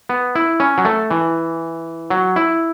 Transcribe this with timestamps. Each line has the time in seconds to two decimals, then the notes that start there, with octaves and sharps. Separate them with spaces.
0.09 B3
0.35 E4
0.60 C#4
0.78 F#3
0.85 A3
1.11 E3
2.10 F#3
2.36 E4